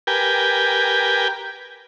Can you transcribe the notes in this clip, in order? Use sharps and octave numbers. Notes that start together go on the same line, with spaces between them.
G4 A#4 B4 G5 G#5